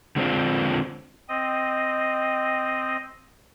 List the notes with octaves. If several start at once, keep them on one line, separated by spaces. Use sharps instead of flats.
D3 G#3 C4 D4 F4
C4 D#5